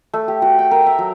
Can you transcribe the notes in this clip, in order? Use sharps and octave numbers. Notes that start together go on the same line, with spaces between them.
A3
G4
F#4
G5
A#4
E5
F#3